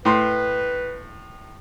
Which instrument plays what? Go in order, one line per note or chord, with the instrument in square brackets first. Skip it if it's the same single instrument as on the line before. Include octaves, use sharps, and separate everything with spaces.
[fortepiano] A2 C6 [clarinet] B4